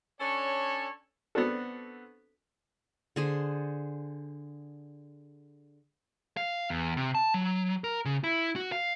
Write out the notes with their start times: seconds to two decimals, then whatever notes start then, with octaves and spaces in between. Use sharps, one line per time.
0.20 C#4 D4 A4 C#5
1.35 B3 C4 D4 F#4 A4
3.16 D3 G#4 C5
6.37 F5
6.70 E2
6.97 C3
7.15 A5
7.34 F#3
7.84 A#4
8.05 C#3
8.24 E4
8.56 F#4
8.72 F5